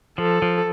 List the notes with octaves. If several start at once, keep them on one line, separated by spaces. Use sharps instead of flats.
F3 A4
F3